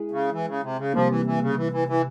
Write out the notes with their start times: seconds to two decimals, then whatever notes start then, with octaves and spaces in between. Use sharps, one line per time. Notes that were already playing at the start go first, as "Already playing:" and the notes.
Already playing: G#3 E4 G#4
0.11 C#3
0.32 E3
0.47 C#3
0.63 C3
0.79 C#3
0.94 C3 F3 G3 A#3
1.09 E3
1.25 E3
1.41 C#3
1.57 E3
1.72 E3
1.88 E3